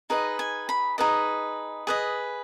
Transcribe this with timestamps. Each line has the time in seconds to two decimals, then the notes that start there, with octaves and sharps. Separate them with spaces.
0.10 D#4 G#4 B4 D#5
0.39 G#5
0.69 B5
0.98 D#4 G#4 B4 D#5
1.87 G#4 B4 D#5